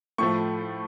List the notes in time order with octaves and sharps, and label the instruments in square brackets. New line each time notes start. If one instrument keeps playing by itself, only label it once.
[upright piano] A2 F3 A3 C#6